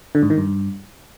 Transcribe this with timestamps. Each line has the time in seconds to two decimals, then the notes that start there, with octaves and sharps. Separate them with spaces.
0.15 D3
0.22 G#2
0.30 D#3
0.38 G2